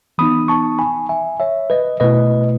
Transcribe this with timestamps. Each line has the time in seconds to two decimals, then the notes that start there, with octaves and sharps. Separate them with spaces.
0.18 E3 B3 D#4 B5 D#6
0.48 A5 C#6
0.79 G#5 B5
1.09 E5 G#5
1.40 C#5 E5
1.70 B4 D#5
2.00 B2 A3 E4 B4 D#5